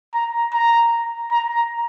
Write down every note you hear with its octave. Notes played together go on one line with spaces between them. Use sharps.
A#5
A#5
A#5